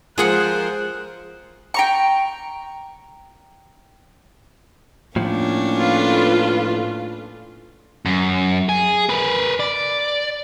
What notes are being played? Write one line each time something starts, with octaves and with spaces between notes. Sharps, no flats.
F3 G#3 F4 G#4 A#4 C5 F#5 F#6
G5 A#5 C#6
A2 F3 A#3 C#4 D4
F4 A4 B4
F#2
G#4
A#4 B4
D5